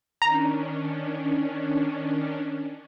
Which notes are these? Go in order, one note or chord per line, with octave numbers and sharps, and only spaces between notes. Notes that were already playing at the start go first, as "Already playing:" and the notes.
D#3 C#4 D4 A#5